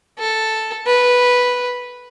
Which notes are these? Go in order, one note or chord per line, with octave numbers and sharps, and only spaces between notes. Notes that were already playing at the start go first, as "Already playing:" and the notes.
A4
B4